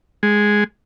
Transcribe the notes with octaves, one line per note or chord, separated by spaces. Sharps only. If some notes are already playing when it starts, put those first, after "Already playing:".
G#3